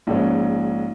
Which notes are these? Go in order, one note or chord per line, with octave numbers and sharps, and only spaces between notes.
A#1 G#2 G#3 C#4